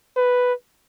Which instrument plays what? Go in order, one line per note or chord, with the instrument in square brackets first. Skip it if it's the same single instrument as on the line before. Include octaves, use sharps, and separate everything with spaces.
[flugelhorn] B4